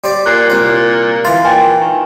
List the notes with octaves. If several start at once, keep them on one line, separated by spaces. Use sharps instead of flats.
G3 C5 D5
A#2 F#6 C7
C2 C5
E3 F5 C6 A6
A#2 G5 G#5 C6
D#3